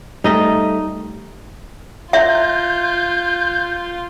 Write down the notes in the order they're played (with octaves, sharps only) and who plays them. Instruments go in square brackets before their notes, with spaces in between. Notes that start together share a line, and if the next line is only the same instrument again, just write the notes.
[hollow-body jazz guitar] G3 A3 [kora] D#4 D#5
[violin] F4 [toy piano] E5 [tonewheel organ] G6